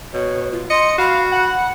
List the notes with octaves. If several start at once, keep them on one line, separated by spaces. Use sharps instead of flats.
B2 C#5
F4
D#5 C6 C#7
F#4 F5 B5
F#5